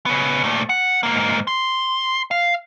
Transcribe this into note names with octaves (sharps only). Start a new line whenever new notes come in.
C#3 B3
A#2 A3
F#5
G#2 A#3
C6
F5